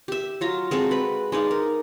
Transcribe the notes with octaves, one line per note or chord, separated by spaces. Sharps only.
G4 E5
F#3 F4 A#5
G#3 C4 F#4 A4
B4 B5
G#3 D#4 D5 F5
A#4